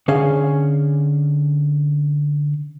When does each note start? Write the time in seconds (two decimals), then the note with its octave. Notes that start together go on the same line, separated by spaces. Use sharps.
0.08 D3 C#4 G#4 F5